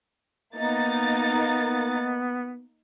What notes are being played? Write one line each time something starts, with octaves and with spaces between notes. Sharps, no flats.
A#3 B3 D#4 A6